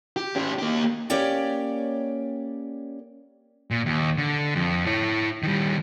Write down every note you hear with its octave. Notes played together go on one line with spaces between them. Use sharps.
G4
C#4 G4
A#3 G4
A#3 C#4 G4 C#5 D5 G5
A#2
D#2
D3
F2
E4 C#5
D#3 G3